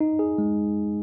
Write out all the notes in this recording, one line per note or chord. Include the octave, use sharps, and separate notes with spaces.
D#4
G#4
G#3